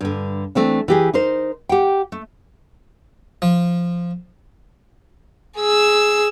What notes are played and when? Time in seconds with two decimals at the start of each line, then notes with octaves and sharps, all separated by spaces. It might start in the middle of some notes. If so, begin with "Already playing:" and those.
0.01 G2 D3
0.55 E3 A3 C4 D4
0.88 E3 G4 G#4
1.14 D#4 A#4 C5
1.69 G4 F#5 G5
2.12 A3
3.42 F3
5.58 G#4 E6